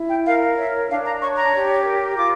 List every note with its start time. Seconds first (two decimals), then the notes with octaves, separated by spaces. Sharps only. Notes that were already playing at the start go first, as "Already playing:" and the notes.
Already playing: E4
0.09 G5
0.25 A#4 F5
0.58 C#5 E5
0.89 D4 F5
1.05 A#5
1.21 C#5 C#6
1.37 A#5
1.53 G4
1.84 A#4
2.16 F4 D6